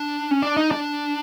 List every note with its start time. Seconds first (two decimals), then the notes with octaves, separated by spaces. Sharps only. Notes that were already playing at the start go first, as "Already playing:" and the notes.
Already playing: D4
0.31 C#4
0.42 D4
0.57 D#4
0.71 D4